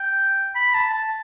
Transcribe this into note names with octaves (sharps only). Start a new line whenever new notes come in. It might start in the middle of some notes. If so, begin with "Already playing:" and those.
Already playing: G5
B5
A5
A5